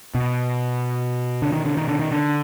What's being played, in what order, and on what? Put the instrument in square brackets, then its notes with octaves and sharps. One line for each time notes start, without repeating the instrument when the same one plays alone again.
[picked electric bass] B2
D3
D#3
D3
D#3
D3
D#3
D3